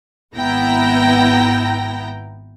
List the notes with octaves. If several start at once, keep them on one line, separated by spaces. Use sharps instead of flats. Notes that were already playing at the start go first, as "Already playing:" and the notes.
G#1 B3 E4 G5 A#5 A#6